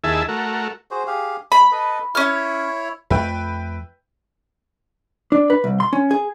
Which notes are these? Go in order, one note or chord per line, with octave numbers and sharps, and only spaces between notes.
D#2 E4 G#4 E5 A5
A3 F#4 A#4
F#4 G#4 C5
G4 G#4 F5
G#3 B5
A4 B4 D#5
C#4 E4 C#5 F6
F2 A3 B4 E5 G5
D4
B4
C2
C6
C#4
G#4